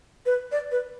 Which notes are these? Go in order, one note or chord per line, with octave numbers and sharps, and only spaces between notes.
B4
D5
B4